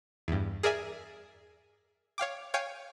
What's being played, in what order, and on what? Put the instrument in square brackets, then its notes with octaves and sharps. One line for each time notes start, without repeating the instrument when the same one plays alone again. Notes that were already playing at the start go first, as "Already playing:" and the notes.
[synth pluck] E2 G2
G#4 A#4 D5 E5 G#5
C#5 F5 G5 D6
C#5 F5 G5 G#5 G6